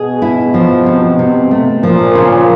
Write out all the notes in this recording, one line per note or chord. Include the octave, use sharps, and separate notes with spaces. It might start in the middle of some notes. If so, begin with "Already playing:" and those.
Already playing: B2 G#4
E4
F3
C3
C3
A3
A#2 F3
C#3